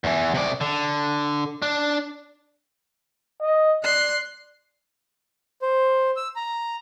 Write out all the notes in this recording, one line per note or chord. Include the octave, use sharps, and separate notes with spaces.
E2 E3
C3 D5
D3
D4
D#5
D5 C6 F#6
C5
E6
A#5